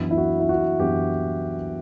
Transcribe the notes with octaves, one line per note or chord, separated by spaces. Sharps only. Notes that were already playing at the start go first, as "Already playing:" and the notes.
Already playing: F#2 E3 B3 D4
E4
F#4
E4
F#4
F#2 E3 B3 D4 G4